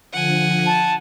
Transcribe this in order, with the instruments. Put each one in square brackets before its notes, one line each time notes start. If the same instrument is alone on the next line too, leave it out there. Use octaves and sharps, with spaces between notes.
[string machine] D3 F3 [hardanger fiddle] F#5 G#5
[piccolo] A5